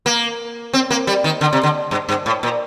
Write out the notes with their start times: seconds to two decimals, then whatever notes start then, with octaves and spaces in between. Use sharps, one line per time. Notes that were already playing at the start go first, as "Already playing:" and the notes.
0.06 A#3
0.73 C4
0.90 A#3
1.07 G3
1.24 D#3
1.41 D3
1.53 C3
1.63 D3
1.91 G2
2.09 G2
2.26 A2
2.43 A#2